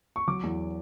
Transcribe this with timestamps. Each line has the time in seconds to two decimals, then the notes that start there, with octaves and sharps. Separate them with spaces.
0.16 C#6
0.27 F#3 D6
0.43 E2